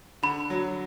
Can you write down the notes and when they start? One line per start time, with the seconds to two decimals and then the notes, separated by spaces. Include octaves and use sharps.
0.23 D3 B5
0.50 F#3